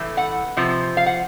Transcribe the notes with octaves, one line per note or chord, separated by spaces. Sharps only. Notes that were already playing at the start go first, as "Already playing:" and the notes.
Already playing: A2 E3 A3
F#5
C3 F3
F5
F#5